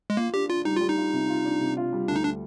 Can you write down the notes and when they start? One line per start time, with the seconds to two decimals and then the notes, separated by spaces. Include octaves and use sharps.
0.10 G#3
0.17 A#3 F4
0.33 D4 G4
0.49 D4 F4
0.65 G3 D#4
0.76 G3 F4
0.88 D#4
0.97 F4
1.13 C3
1.29 F4
1.45 D4
1.61 C3
1.77 F4
1.93 G3
2.08 D2 D4
2.16 D#4
2.24 D4